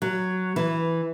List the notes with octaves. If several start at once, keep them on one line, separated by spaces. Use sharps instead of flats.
F#3
E3